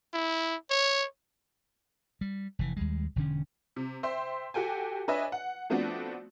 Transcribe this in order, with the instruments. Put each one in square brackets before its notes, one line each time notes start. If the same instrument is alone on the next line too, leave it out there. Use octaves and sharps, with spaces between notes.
[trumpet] E4
C#5
[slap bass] G3
F1 E3
D#2 G3 G#3
E1 D3 C#4
[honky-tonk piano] C3
C5 E5 G5 C6
F#4 G4 A4 G5 G#5
D4 B4 C#5 D#5 E5 G#5
F#5
F3 A3 B3 C4 D4 F#4